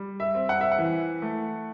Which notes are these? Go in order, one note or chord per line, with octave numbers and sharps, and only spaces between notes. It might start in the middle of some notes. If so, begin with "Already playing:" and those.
Already playing: G3
E5
C4
F#5
E5
F#5
E3
A3